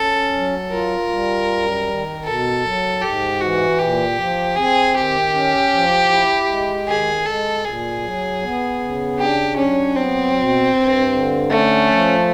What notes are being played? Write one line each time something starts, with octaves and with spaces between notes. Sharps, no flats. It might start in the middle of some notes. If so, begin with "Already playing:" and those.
Already playing: C#4 A4
F#3
F4 A#4
G3
F#2
D#3
B2 A4
F#3
G#2 G4
E3 F#4
A#2 G4
F3
C4 G#4
D#3 G4
C#4
F3
E4
G#3
D#3 G#4
G#3 A4
A#2 G#4
F#3
B3
C#3
D4 G4
F#3 C#4
B3 C4
B2
G2
D3
A3 C#4
F3